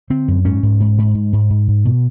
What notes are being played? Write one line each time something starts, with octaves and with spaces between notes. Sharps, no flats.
D3 C4
F#2
G#2 C#4
G#2
G#2
G#2
G#2
G#2
G#2
G#2
B2